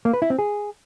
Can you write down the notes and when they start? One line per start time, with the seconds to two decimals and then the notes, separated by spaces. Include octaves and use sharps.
0.05 A#3
0.13 B4
0.22 E4
0.30 C4
0.39 G#4